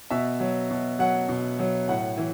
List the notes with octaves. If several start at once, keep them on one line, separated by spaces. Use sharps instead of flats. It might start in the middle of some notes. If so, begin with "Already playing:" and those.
B2 E5
F#3
B2
F#3 F#5
B2
F#3
A2 F#5
E3